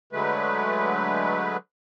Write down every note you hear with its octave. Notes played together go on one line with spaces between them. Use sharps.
D3 F#3 G#3 A3 B4